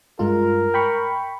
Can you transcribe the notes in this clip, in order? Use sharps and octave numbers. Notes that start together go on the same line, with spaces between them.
G2 G#3 F4 A#4
G5 B5 C#6